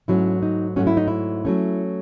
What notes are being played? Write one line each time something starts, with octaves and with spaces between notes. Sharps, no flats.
G#2 F#3 A3 C#4 E4
D#4
G#2 F#3 A3 C#4 F#4
E4
D#4
E4
F#3 A3 C#4